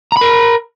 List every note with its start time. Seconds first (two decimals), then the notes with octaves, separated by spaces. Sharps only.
0.12 A#5
0.17 B5
0.21 A#4